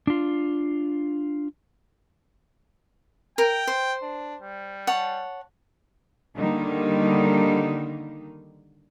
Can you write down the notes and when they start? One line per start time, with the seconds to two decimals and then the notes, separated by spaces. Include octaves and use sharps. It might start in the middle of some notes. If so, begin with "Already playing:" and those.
0.07 D4 F4
3.38 A#4 G5
3.67 C5
4.02 D4
4.42 G3
4.87 C#5 F#5 A5
6.36 D3 D#3 G3 A#3 D#4